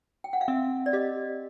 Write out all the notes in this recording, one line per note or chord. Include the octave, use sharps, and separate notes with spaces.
G5
F#5
F5
C4 E5
D5
G4 D#5